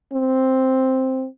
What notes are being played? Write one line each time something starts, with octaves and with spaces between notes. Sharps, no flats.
C4